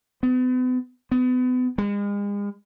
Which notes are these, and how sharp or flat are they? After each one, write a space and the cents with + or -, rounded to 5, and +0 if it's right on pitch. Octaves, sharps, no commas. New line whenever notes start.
B3 +40
B3 +35
G#3 -40